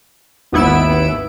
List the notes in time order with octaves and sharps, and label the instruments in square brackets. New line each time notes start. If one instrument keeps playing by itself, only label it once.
[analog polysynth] G#1 D#2 B3 E4 E6 D7